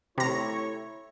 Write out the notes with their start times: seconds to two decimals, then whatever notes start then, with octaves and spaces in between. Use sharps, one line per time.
0.18 C3 A3 E4 C#5 A#5